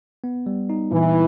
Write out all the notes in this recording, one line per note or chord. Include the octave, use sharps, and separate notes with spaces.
B3
G3
D#4
A#2 E3